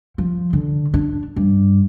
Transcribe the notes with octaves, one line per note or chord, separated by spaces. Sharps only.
F3
D3
D4
G2